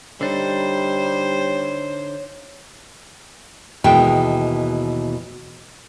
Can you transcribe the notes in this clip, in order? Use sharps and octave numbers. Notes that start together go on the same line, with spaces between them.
D3 G3 D4 D#4 C5 C#5
D#2 B2 E3 G#3 G5